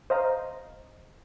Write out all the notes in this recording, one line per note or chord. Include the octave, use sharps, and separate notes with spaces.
C5 D#5 F5 A#5